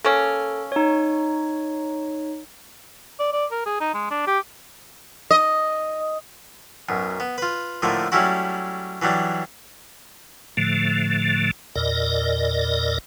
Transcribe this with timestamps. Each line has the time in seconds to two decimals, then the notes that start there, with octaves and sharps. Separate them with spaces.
0.05 A#3 C#4 A4
0.72 D#4 C#5
3.19 D5
3.33 D5
3.51 A#4
3.66 G#4
3.80 D#4
3.94 G#3
4.11 D4
4.27 G4
5.31 D#5
6.89 B1 F#2
7.20 B3
7.38 F4 B4
7.82 A2 D3 F3 A3 A#3
8.12 F#3 G3 A3 C#4 E4 F#4
9.02 E3 F#3 G3 D4
10.57 A2 D3 F3 A3
11.76 E2 A#2 A#4 D5 D#5